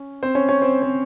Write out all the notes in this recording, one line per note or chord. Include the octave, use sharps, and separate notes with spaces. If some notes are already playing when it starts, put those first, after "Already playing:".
Already playing: C#4
C4 C5
C#4 C#5
C#4 C#5
C4 C5
C4 C5